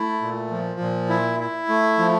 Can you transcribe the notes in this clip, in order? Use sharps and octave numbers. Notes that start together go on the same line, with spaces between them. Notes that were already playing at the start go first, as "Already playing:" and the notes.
Already playing: A3 E4
A#2
F3
A#2
E4
E4
A3
F3